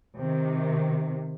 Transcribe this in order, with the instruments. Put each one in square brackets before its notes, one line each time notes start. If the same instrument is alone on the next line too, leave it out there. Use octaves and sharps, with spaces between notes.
[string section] C3 D#3